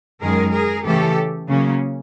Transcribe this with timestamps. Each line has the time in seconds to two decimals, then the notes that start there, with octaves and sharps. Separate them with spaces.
0.21 F#2 D#3 G#3 G#4 A#4
0.53 G#4 A#4
0.85 C#3 E3 A3 C#4 G4 A4
1.48 C#3 F#3 A#3 C#4